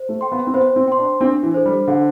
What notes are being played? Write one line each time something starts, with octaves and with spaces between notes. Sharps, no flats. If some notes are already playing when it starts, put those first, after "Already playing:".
Already playing: C5
A3
G5 C6
B3
C4
B3 C5
C4
G5 C6
D4
C4 D4
E3
A4 C5
G3
D3 D4